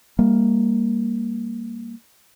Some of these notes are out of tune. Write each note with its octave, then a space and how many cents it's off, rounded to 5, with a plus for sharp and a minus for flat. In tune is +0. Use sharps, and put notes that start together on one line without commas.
G3 +30 A#3 +0